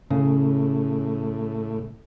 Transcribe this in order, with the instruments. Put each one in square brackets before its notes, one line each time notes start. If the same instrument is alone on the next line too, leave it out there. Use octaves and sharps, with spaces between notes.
[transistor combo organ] A2 [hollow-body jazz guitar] C#3